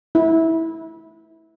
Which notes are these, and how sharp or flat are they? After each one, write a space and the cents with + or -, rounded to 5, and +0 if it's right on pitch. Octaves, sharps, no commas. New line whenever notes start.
E4 -20